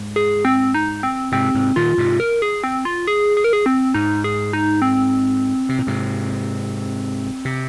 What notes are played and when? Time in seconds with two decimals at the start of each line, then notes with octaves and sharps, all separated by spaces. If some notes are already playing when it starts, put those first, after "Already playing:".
Already playing: G#2
0.16 G#4
0.45 C4
0.74 D#4
1.03 C4
1.32 G#2 C3 C4
1.55 G#2 C3
1.76 A#2 D#3 F4
1.98 G#2 C3
2.20 A#4
2.42 G#4
2.64 C4
2.85 F4
3.07 G#4
3.37 G#4
3.44 A#4
3.53 G#4
3.66 C4
3.94 G#2 D#4
4.24 G#4
4.53 D#4
4.82 C4
5.69 C3
5.79 A#2
5.87 G#2 C3
7.45 C3